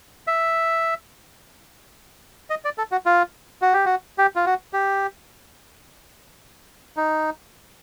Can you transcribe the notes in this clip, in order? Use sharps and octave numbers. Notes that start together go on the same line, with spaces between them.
E5
D#5
D5
A4
F#4
F4
F#4
G4
F#4
G4
F4
F#4
G4
D#4